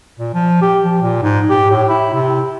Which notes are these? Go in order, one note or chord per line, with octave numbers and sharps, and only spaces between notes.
A#2
F3
G4
F3
A#2
G#2
G4
A2
E4
C3